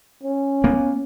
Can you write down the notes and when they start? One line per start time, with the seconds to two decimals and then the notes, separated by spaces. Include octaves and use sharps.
0.23 C#4
0.64 A#3 B3